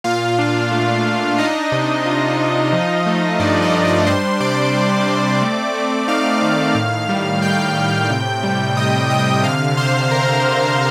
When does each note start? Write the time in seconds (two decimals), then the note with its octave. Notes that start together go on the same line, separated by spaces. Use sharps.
0.04 A#2 F4 F5
0.38 D4
0.71 A3
1.05 A#2
1.38 D4 D#4 D#5
1.72 C3
2.06 F4
2.39 F4
2.73 F3
3.06 A3
3.40 G2 D4 D5
3.62 D#4 D#5
3.73 D4
3.85 D#4 D#5
4.06 G3 C5 C6
4.40 C3 D5 D6
4.74 G3
5.08 C4
5.42 A3
5.75 A3
6.08 D#4 F5 F6
6.42 D#3
6.75 A2
7.09 G3
7.42 A2 G5 G6
7.76 A2
8.10 C3
8.43 G3
8.77 C3 D#5 D#6
9.10 C3 D#5 D#6
9.43 D3 F5 F6
9.77 D3 C5 C6
10.11 D3 A#4 A#5
10.45 D3